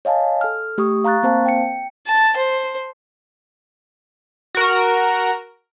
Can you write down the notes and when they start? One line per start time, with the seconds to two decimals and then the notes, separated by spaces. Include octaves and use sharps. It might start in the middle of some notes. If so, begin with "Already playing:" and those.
0.05 C#5 D#5 F5 G#5 A5
0.41 A4 F6
0.78 A3 G4 C#6 D#6
1.04 F5 A#5 C#6 F#6 A6
1.23 A#3 C4 C5 F5 A5
1.46 G5 C#7
2.07 A5
2.37 C5
4.55 F#4 A#4